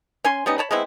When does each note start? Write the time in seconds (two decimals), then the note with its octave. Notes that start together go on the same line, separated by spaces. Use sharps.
0.24 C#4 G#5 C6
0.46 G3 B3 C#4 D#4
0.58 C#5 A5 B5
0.71 G#3 B3 C4 E4